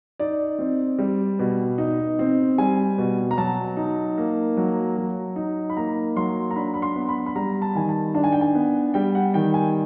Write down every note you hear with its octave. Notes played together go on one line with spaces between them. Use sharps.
D#4 D5
C4
G3
B2
D#4
C4
G3 G#5
B2
A#5
F#3 A5
D#4
A#3
F#3
F#3
D#4
B5
A#3 A#5
F#3 C6
A#5
D4 B5
B5
C6
B3
B5
B5
G3 A#5
A5
D#3 G#5
A5
D4 A5
G#5
G5
G#5
B3
G3 G5
F#5
D#3 G5
G#5